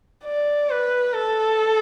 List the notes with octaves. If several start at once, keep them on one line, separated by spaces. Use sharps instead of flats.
D5
B4
A4